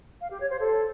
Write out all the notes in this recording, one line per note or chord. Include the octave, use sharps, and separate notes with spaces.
F5
G4
C#5
C5
A4